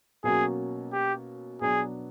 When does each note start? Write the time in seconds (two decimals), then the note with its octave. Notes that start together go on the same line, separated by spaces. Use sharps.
0.24 B2 F#3 A#3 C#4 F#4 G#4
0.92 G4
1.61 B2 F#3 B3 D4 G#4